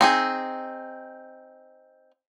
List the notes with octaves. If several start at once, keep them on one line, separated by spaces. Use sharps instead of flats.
C4 D#4 G#4